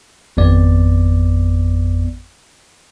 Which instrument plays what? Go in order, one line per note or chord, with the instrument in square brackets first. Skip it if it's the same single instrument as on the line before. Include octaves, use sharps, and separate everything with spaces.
[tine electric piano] G#1 F2 B3 D5